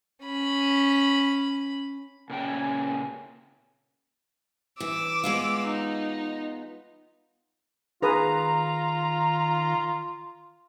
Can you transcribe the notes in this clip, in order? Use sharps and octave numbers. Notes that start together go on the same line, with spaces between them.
C#4 B5
A#2 C#3 C#4 G5 G#5
E3 D6 E6
G#3 B3 F4
D#4
D#3 F4 G#4 B4 A#5 D#6